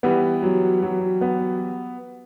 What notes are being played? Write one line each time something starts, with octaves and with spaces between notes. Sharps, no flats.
E3 G3 B3
F#3
F#3
B3